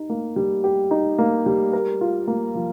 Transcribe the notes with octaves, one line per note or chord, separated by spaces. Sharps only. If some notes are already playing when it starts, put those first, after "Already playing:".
Already playing: D#4 G4
A#3
G3
G4
D#4
A#3
G3
A#4
F4
A#3
F3